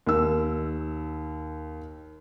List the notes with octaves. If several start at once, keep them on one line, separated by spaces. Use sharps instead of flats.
D#2 E6